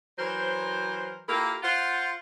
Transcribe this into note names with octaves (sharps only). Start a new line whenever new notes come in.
E3 F#3 A#4 C5
A#3 E4 F4 G4 A4 A#4
F4 C5 F#5